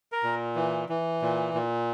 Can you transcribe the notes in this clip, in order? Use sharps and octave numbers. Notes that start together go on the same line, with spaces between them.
A#4
A#2
E3
E3
A#2
A#2